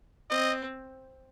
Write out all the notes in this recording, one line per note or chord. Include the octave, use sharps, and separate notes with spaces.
C4 D#5